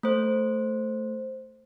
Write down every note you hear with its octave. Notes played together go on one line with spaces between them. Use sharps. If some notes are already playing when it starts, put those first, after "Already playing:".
A3 C5